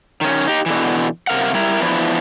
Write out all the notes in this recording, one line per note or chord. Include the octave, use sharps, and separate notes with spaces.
D#3 C#4
D#4 G4
B2 D3 E3
C3 A#4 F5 F#5
G3 E4 A#4
E3 F3 B3 D4 E4